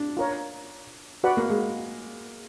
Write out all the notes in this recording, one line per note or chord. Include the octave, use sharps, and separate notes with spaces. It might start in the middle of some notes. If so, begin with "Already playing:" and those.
Already playing: D4
F4 A#4 C#5
F#4 B4 D5 F#5 B5
A#3
G#3